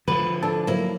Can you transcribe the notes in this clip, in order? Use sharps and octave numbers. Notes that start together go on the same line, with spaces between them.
D3 F3 B4
D4 A4
F3 F#3 A#3 E4